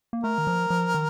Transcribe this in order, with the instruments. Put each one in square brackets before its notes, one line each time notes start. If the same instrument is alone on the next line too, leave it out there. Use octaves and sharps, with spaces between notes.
[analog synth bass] A#3
[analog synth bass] A3 [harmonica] A#4
[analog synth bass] D#3
F3
F3
D#3